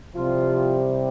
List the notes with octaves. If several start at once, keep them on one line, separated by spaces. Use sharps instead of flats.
C2 C3 F3 G3 F4